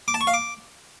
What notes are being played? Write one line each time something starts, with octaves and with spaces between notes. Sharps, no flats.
D6
A5
C#6
F5
D6